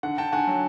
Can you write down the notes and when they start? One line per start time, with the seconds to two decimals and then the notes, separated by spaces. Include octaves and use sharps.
0.03 D3 F#5
0.18 D3 G5 A5
0.32 D3 F#5 G#5
0.47 F#3